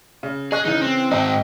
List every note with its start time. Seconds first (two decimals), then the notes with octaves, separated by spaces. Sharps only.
0.23 C#3
0.52 G#4 D#5 C#6 F#6
0.65 C#3 E3 D#4
0.82 C4
1.11 G#2 C4 D#5 E5 G5